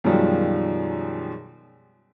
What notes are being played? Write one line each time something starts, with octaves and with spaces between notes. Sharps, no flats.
F#2 B2 D#3 F3 G3 G#3